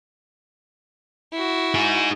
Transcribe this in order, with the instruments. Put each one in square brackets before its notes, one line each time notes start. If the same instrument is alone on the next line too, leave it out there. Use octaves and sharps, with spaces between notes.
[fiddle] E4 F#4
[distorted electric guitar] D#4 G#4